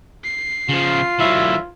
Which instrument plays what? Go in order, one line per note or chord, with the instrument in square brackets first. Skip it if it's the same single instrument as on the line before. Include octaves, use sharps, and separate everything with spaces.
[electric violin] C7
[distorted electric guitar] C#3 F3 [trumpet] F4
[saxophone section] D2 E5 [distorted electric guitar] E3 F#3